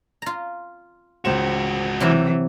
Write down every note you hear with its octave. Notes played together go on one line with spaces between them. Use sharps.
F4 A#5
C#2 G#2 F#4 C5 E7
C3 E3 F#3 E4